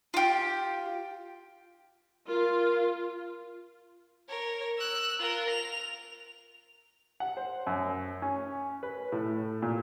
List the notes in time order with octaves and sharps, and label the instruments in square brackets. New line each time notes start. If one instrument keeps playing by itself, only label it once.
[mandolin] F4 G4
[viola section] F4 [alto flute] A#4
[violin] A#4 C#5
E6 F#6
F4 A#4
F7
[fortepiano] F#5
C5
F#2
C#4
B4
A2
A#2